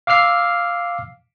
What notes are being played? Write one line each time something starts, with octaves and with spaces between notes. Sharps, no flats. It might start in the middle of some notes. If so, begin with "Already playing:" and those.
F5 D6 E6 F6 C7